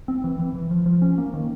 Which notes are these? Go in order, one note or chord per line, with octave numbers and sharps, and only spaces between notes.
C4
E3
E3
E3
F3
F3
C#4
A#3
D#3